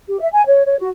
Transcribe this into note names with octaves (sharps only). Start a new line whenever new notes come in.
G4
E5
G#5
C#5
C#5
F#4